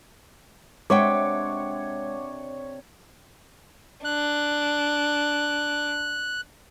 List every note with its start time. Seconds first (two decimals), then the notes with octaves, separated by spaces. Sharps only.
0.90 C3 G#3 D4 C#5 E5 F#5 G5 D6
4.05 D4 F#6